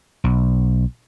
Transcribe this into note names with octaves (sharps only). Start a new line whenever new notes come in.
B1